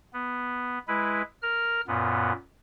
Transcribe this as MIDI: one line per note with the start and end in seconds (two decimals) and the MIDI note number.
0.13 0.79 59
0.88 1.22 56
0.88 1.22 64
0.88 1.22 71
1.42 1.81 70
1.42 1.81 89
1.87 2.32 42
1.87 2.32 46
1.87 2.32 59